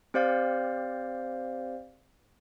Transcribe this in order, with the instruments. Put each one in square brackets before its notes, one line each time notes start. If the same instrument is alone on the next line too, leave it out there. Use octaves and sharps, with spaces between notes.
[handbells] C4 G4 C5 D5 F5